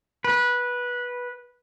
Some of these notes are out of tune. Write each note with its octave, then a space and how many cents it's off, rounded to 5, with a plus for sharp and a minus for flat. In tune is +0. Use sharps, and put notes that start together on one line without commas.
B4 -15